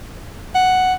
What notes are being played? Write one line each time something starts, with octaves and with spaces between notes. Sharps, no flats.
F#5